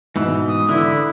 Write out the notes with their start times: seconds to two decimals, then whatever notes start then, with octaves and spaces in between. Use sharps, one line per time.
0.16 G#2 B2 E3
0.48 D#6
0.69 D3 E4